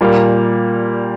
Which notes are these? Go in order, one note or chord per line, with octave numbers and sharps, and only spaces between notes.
A#2 G3 A#3